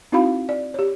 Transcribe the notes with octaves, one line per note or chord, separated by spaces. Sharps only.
C4 D#4 E4 F#4 F5 B5
D5
G4 C#5